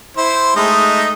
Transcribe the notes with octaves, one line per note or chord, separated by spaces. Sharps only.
E4 C5
G#3 A3 D#4